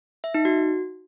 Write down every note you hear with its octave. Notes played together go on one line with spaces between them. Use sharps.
E5
D#4
F#4